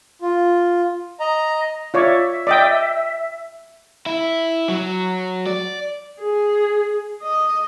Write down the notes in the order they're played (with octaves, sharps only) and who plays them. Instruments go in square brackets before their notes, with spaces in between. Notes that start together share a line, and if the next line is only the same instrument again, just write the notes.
[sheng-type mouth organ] F4
D#5 A#5
[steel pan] F4 C#5 D5 [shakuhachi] E5
[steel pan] D5 D#5 G5
[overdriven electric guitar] E4
F#3
D5
[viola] G#4
D#5